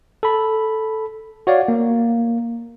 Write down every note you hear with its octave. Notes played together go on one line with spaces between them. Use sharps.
A4 B5
F#4 C#5 D5 F5
A#3